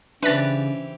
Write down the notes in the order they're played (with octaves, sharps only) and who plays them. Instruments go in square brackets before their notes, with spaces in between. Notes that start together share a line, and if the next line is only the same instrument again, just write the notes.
[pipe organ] C#3 [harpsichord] E3 C4 G4 [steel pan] D4 [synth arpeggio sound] B4 A6